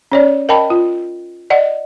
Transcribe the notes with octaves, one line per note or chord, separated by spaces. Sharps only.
C#4 C#5 D5
A#4 D#5 G5 A5 B5
F4
D5 D#5 F#5